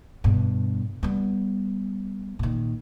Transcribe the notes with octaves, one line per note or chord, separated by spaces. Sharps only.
G2 B2
G3 B3
A#2 D#3